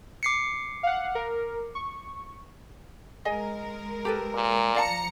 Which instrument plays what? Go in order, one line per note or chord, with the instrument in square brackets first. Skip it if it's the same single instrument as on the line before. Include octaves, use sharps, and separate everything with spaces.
[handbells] D6 C7 C#7
[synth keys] F5 F#5
A#4
C#6
[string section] G#3 A#4 [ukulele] G#4 D#5 G#5
[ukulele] G4 A4 B4
[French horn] A#2
[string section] F3 A#5 C#7 [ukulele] D5 F5 A5